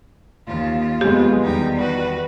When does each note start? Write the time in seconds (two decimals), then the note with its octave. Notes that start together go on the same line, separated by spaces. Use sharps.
0.48 D#2 F4
1.01 F2 G#3 B3 G4
1.42 E2 D#3 G3 D#4 G5
1.78 F#4 B4